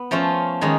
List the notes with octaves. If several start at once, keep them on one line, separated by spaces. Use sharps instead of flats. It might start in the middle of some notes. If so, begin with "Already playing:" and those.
Already playing: B3
F3 A3 C#4 F4
D#3 G#3 C#4